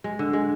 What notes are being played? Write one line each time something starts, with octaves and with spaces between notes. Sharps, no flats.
G#3
D3
G#3